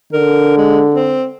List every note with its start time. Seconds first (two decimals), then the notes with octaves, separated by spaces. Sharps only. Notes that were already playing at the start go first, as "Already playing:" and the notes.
0.13 D3 A#4
0.57 G#3
0.95 C4